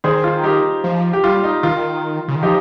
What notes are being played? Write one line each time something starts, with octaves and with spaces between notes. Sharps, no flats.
D#3 G#4 C5
F4
D#4 G4
F3
G4
G3 F4
D#4
D#3 F4
C#3
D#3
F3 D#4 G4